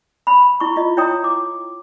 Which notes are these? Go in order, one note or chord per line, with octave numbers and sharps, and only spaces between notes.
B5
E4 C#6
F4 D#5
E4 C#5 G5 A#5 D#6
D6